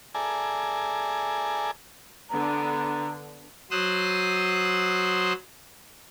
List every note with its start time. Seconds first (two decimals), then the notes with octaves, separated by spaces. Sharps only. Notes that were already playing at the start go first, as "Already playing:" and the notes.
0.15 G#4 A4 D5 E5 G#5 A#5
2.30 D3 B3 D4 A#5
3.71 F#3 C5 C6 D#6 E6 F#6